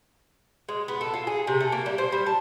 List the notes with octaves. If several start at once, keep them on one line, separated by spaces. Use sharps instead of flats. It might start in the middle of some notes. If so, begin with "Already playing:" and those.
G#3
B3
A4
F4
G#4
C3
A3
A#3
G3
C5
G3
A5